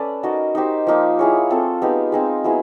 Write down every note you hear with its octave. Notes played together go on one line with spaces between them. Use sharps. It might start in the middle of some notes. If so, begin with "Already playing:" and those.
Already playing: C#4 A4 B4 D5
D#4 F#4 A#4 D#5
D#4 G4 C5
F3 A#3 D#4
E4 G#4 C#5
C4 F4 A4
G#3 B3 D#4 G4
G#3 C4 D#4 G#4
F#3 B3 E4 G#4